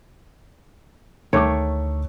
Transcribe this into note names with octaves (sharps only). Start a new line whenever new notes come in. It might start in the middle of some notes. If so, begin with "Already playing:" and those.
D2 D#3 A3 C#5 D6